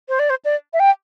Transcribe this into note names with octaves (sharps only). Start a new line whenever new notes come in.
C5
D5
C5
D5
E5
G5